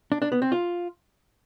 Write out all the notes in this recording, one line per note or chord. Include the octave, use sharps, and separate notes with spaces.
D4
D4
B3
C4
F4